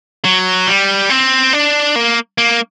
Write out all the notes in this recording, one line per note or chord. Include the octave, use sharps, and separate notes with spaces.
F#3
G3
C4
D4
A#3
A#3